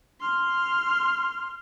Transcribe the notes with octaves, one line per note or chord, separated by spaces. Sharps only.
C6 F6